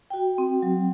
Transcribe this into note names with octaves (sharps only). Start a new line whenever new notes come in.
F#4 G5
C4
F#3